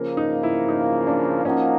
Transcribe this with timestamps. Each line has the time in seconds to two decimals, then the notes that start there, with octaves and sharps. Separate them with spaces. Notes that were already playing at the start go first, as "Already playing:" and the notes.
Already playing: C#3 F3 A#3
0.17 D#4
0.43 E4
0.68 D#4
1.07 D4
1.45 F3 A#3 C#4 D#4 F#4